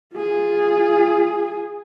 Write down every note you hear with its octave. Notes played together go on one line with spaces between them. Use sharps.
F4 G#4